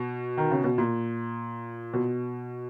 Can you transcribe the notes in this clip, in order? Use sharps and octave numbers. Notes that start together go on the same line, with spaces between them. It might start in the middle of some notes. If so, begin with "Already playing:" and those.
Already playing: B2
D#3
C#3
B2
A#2
B2